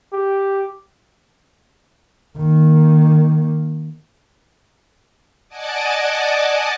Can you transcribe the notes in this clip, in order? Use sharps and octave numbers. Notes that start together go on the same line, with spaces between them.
G4
D#3 A#3
D5 D#5 F#5 G#5 A5 D6